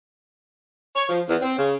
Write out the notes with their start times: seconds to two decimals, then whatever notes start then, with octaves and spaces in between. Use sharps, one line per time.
0.94 C#5
1.09 F3
1.27 E2
1.41 C4
1.58 C#3